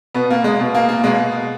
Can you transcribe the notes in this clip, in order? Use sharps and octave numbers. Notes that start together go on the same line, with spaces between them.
B2 B3
A#3
G#3
B2
A#3
A#3
B2 G#3